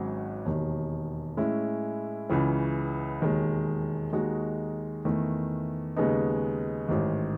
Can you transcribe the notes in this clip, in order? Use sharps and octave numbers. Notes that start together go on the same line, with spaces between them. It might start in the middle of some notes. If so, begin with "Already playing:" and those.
Already playing: G#1 G#2 F#3 C#4
E1 D#2 D#3
A2 G#3 C#4 E4
C#2 C#3 E3
E1 D#2 D#3 G#3
D#2 D#3 G#3 D#4 F#4
E2 D#3 A3
D#2 C#3 G#3 B3 D#4
A1 G#2 D#3